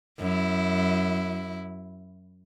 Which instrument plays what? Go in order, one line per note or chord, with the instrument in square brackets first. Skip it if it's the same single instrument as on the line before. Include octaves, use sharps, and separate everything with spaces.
[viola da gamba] F#2 E4